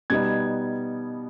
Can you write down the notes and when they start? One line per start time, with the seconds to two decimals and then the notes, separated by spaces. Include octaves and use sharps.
0.10 B2 G3 B3 D#4 G#6